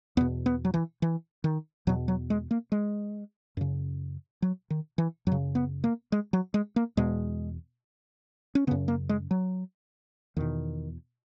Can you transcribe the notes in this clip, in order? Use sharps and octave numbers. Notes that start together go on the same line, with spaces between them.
E2 B2 B3
B3
F#3
E3
E3
D#3
E2 B2 F#3
F#3
G#3
A#3
G#3
F#2 C#3
F#3
D#3
E3
F#2 C#3 F#3
B3
A#3
G#3
F#3
G#3
A#3
E2 B2 G#3
C#4
F#2 C#3 B3
A#3
G#3
F#3
E2 B2 D#3